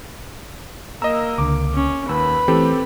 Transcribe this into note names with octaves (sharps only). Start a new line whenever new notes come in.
A#3 D#5 A#5 E6
C#2 D3 D6
C#4
D#2 B4 B5 E6
E3 A3 C4 G4 A4